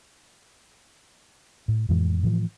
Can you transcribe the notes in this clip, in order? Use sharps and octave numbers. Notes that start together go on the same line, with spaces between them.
A2
F2 A2 E3 G#3
A2 E3 F3